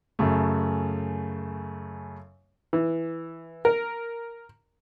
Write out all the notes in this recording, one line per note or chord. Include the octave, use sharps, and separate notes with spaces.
F#2 C#3 A3
E3
A#4